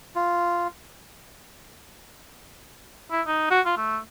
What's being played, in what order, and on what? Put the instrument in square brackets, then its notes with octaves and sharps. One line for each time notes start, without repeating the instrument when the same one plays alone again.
[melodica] F4
[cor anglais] E4
D#4
F#4
F4
A3